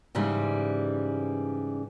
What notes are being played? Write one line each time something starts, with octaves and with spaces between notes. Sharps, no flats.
G#2 C#3 E3 G3